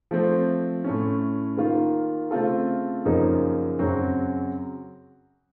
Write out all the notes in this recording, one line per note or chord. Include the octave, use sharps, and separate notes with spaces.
F3 A3 C4
A2 A3 C#4
D#3 A#3 F4
C#3 A3 C4 F4 A4
F#2 C#3 F3 A#3 D#4
F#2 C#3 F#3 C4 F#4